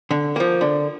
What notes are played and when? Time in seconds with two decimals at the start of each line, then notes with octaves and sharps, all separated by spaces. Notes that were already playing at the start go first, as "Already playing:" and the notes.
0.11 D3
0.36 F3 A#3
0.61 D3